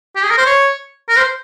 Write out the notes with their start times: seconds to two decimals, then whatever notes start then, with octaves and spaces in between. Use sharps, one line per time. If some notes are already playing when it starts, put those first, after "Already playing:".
0.16 G4
0.23 G#4
0.31 A#4
0.38 C5
0.46 C#5
1.09 A#4
1.17 C5